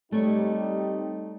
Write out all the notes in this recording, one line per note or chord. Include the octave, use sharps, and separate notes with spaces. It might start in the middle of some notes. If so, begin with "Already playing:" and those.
G3 A3 C4 D#4 G4 C#5